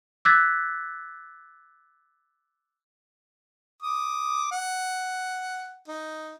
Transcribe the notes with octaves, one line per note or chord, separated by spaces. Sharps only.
D6 E6 F#6 G#6 A6 B6
D6 D#6
F#5
D#4